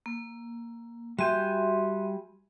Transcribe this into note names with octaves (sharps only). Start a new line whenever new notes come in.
A#3
G3 F#4 E5 G#5 C6 G6